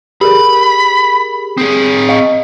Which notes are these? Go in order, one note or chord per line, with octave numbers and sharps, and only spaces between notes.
G4 G#4 A#4 B5
C4 G#4 D#6
D#5 F5 C#6